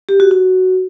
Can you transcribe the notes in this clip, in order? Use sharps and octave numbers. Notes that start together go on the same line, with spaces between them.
G4
F#4
F#4